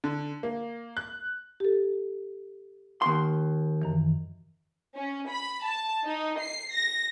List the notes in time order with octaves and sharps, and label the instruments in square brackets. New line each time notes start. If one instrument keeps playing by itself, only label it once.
[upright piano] D3
A#3
F#6
[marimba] G4 A4
[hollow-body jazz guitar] D#2 C6
[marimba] F#2 D#3 E3
[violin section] C#4
B5
A5
D#4
C7
A#6